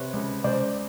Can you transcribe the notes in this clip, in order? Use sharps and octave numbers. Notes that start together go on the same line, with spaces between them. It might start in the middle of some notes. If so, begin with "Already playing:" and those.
Already playing: C3 B4 C#5
C#2
C#2 C5 D5